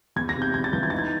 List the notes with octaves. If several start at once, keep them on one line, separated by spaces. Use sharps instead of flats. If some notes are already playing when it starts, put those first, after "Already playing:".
E2 G#6
A#6
C3
G6
E2 G#6
A6
E3 G6
G#6
D#4 A6
G#6